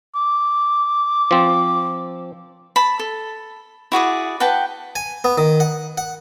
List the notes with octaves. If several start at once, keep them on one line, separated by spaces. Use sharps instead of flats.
D6
F3 C4
A5 B5
A4
E4 F#4 G#4 D5
B4 F#5 G5 A5
G#5
B3
D#3
F#5
F#5